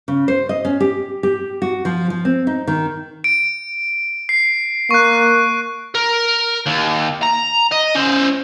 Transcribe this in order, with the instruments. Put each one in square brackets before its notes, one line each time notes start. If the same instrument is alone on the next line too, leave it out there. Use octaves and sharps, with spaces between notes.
[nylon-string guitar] C#3
C5
D#5
C#4
G4
G4
F#4
F3
F3
C4
D#4
D#3
[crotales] D7
C7
[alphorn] A#3 [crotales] C#6 F#6
[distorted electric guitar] A#4
D#2
A#5
D#5
C#4 C5